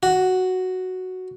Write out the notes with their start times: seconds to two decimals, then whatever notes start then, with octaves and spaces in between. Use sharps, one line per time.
0.03 F#4